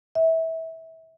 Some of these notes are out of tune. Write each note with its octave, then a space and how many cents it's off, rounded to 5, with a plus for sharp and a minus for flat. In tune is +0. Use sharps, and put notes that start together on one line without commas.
E5 -25